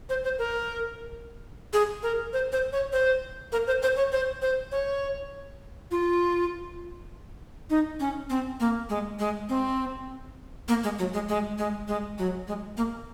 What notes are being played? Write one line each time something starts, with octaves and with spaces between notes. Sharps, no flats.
C5
C5
A#4
G#4
A#4
C5
C5
C#5
C5
A#4
C5
C5
C#5
C5
C5
C#5
F4
D#4
C#4
C4
A#3
G#3
G#3
C4
A#3
G#3
F#3
G#3
G#3
G#3
G#3
F#3
G#3
A#3